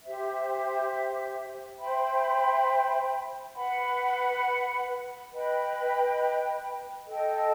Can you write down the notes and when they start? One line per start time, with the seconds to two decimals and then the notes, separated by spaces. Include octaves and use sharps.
0.03 G4 C5 E5
1.79 C5 E5 G5 B5
3.55 B4 F#5 B5
5.32 B4 D#5 G5 B5
7.07 A4 D#5 G5